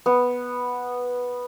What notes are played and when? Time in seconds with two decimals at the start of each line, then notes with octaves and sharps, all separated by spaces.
0.06 B3